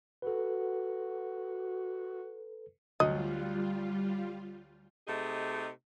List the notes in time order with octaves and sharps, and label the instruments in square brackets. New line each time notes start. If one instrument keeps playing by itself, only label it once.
[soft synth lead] F#4 [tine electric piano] A4 B4
[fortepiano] D2 F#3 [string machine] G3 F4 [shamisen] D#5
[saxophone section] C3 A3 D#4 G#4 D#5